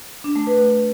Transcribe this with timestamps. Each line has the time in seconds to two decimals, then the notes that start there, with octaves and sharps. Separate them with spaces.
0.24 D4
0.36 A3
0.47 B4